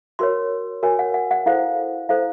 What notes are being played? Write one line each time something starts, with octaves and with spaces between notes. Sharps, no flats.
F#4 A#4 C#5 C6
F#4 A#4 C#5 G#5
F#5
F#5
F#5
E4 A4 C5 F5
E4 A4 C5 F5